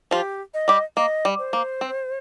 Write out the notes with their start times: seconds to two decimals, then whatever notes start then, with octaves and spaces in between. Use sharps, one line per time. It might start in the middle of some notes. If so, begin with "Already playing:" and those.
0.11 F3 F4 G4
0.54 D#5
0.68 G3 G4
0.97 A#3 D#5
1.25 G3
1.39 C5
1.53 A#3
1.81 C4